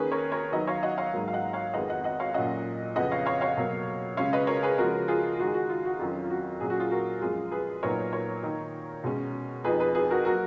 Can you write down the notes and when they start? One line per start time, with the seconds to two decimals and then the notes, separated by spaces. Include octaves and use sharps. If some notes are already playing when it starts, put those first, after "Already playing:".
Already playing: D#3 A#3 C#4 G#4 B4
0.12 A#4 C#5
0.32 A#4 C#5
0.52 D#3 F#3 B3 D#4 B4 D#5
0.67 C#5 F5
0.83 D#5 F#5
0.98 C#5 F5
1.13 G#2 F#3 A#3 D#4
1.28 F5
1.33 D#5 F#5
1.53 C#5 F5
1.74 F2 D#3 G#3 B3 D#5 F#5
1.90 D#5 F#5
2.04 D#5 F#5
2.20 C#5 F5
2.34 A#2 F#3 C#4 D#5 F#5
2.96 F2 C#3 F3 B3 D#5 F#5
3.12 C#5 F5
3.26 C#5 F5
3.41 C#5 F5
3.57 B2 F#3 A#3
4.17 C#3 G#3 C#4 C#5 F5
4.33 B4 D#5
4.47 A#4 C#5
4.63 G#4 B4
4.78 C#3 F3 G#3 B3 F#4 A#4
5.08 F4 G#4
5.39 D#3 G#3 D#4 F#4
5.47 G#4
5.54 F#4
5.69 F4
5.85 F#4
5.99 F2 D#3 F#3 C#4 F4
6.24 F4
6.30 F#4
6.60 A#2 F#3 C#4 G#4
6.70 F#4
6.79 F4 G#4
6.91 F#4 A#4
7.21 F#2 F3 G#3 F4 G#4
7.51 G#4 B4
7.83 A#2 F#3 B3 D#4 A#4 C#5
8.13 A#4 C#5
8.43 D#3 A#3 D#4
9.04 B2 G#3 C#4
9.64 F2 F3 B3 D#4 G#4 B4
9.80 G#4 B4
9.95 G#4 B4
10.11 F#4 A#4
10.25 F#3 A#3 F#4 A#4